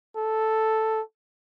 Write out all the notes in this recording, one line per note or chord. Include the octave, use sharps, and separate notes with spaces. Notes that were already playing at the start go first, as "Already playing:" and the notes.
A4